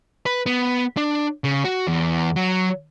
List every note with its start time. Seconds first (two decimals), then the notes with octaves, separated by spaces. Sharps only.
0.26 B4
0.46 B3
0.97 D4
1.44 C#3
1.65 F#4
1.87 E2
2.36 F#3